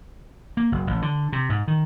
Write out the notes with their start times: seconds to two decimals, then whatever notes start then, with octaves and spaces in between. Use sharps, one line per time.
0.57 A#3
0.72 F#1
0.87 A1
1.02 D3
1.32 C3
1.50 G#2
1.68 D#3